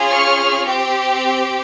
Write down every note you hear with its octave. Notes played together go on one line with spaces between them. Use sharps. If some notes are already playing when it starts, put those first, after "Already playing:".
Already playing: C#4 F4 G#4
C#6 F6
C4 G4